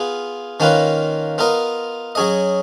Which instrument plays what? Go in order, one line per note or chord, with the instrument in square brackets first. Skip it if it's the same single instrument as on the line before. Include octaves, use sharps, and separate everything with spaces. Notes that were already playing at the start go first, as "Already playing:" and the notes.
Already playing: [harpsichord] B3 F4 G#4
D#3 A#3 C#4 F4 B4
B3 F4 A#4 D#5
F#3 C#4 G#4 D#5